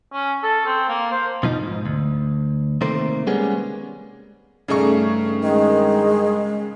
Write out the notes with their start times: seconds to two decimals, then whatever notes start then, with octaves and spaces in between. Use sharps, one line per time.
0.12 C#4
0.43 A4
0.66 C4
0.88 A#3
1.11 C5
1.43 B2 F3 D#4
1.63 G#2
1.86 D2
2.81 C3 D#3 A3 A#3 C5
3.27 G3 G#3 A#3 B3 C#4 G#4
4.68 G2 C#3 A3 D#4 G#4 C#6
5.44 D#3 G#3